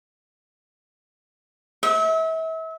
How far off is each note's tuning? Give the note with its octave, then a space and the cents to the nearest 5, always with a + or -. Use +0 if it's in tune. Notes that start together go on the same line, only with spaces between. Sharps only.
E5 -35